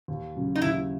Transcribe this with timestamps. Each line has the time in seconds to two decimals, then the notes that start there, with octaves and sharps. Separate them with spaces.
0.08 D#2
0.35 C#3 F#3
0.56 D#4
0.62 D#2 E4